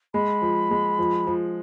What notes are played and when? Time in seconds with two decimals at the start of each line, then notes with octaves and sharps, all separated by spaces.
0.14 G#3 B5
0.42 F3
0.71 G#3
0.98 F3
1.27 F3